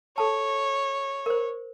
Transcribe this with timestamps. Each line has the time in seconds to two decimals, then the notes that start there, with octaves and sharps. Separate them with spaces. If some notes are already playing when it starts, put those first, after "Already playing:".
0.18 A4 C#5 A5
1.26 A#4 C5